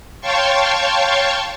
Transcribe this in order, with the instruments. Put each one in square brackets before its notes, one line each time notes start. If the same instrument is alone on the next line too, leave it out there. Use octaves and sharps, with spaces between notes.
[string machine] C#5 F5 G5 A5 C6 C#6